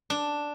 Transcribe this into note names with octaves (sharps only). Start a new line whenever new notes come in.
D4